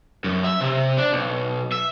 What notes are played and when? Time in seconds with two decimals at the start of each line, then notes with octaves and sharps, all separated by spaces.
0.24 F#2
0.45 E5
0.61 C3
0.98 D4
1.13 B1
1.72 E5